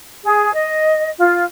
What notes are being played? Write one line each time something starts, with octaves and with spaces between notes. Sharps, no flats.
G#4
D#5
F4